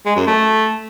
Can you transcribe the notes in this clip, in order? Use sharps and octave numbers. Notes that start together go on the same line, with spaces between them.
G#3
F#2
A3